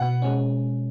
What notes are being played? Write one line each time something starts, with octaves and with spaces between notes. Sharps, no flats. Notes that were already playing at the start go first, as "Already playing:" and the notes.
Already playing: B2 F#5
G#3 C#4